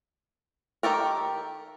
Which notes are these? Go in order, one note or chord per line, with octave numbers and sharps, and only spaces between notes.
D#3 G4 A4 A#4